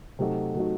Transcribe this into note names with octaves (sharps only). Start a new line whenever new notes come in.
C3 F#3 A3 D#4 F#4
C3 F#3 A3 D#4 F#4